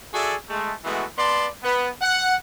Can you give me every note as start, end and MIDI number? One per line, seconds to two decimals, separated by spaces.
0.14 0.35 66
0.14 0.35 68
0.14 0.35 69
0.14 0.35 74
0.14 0.35 76
0.14 0.35 80
0.50 0.73 56
0.50 0.73 57
0.84 1.05 52
0.84 1.05 56
0.84 1.05 57
0.84 1.05 59
0.84 1.05 66
1.18 1.47 59
1.18 1.47 74
1.18 1.47 81
1.18 1.47 84
1.64 1.88 59
2.02 2.35 78